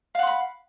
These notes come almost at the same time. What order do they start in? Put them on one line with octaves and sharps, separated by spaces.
F5 F#5 C6 B5